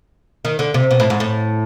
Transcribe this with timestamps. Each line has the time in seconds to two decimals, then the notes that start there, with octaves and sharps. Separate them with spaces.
0.45 D#3
0.59 D3
0.74 C3
0.91 B2
1.00 A2
1.10 G#2
1.20 A2